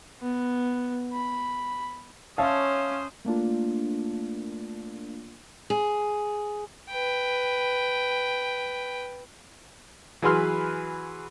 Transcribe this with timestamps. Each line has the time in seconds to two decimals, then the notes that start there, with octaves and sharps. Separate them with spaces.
0.22 B3
1.13 B5
2.38 C#4 C5 C#5 E5 F5 A5 D#6
3.25 A3 A#3 D4 F4
5.70 G#4
6.90 B4 G5
10.22 E3 F#3 G#4 B4 C6 F6